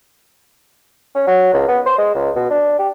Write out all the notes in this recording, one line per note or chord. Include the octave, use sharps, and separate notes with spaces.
C#4
F#3
C#2
B3
C5
G#3
C#2
B2
D4
G4